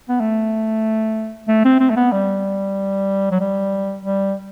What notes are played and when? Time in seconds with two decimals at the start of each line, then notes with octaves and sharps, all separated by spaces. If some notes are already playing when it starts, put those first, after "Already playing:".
0.09 B3
0.20 A3
1.48 A3
1.65 C4
1.80 C4
1.90 A3
1.96 B3
2.12 G3
3.31 F#3
3.40 G3
4.05 G3